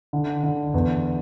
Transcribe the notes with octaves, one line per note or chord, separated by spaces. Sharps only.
D3
D3
E2